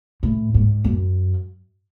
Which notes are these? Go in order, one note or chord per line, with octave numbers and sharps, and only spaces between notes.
A2
G#2
F#2